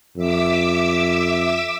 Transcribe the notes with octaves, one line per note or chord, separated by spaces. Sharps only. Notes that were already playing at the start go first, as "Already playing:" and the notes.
F2 E5 D6 E6